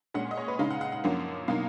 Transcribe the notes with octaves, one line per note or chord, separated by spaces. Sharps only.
A#2 G#3 C#4 F#5
D#5
C#5
B4
C#3 G#3 D#4 F5
F#5
F#5
F#5
F#2 F3 A#3 C#4
B2 F#3 A#3 D#4 F5